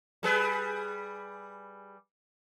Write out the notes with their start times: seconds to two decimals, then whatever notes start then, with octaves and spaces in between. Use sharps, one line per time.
0.23 G3 G#4 B4